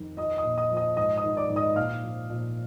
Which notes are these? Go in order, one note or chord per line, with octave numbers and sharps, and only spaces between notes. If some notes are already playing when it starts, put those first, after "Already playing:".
Already playing: F2 D#3
F3 D#5 D#6
D#5 D#6
A#2
D#5 D#6
F3
D#5 D#6
G#2 D#5 D#6
D#5 D#6
D#3
D5 D6
G#2
D#5 D#6
A#2 F5 F6
F3
A#2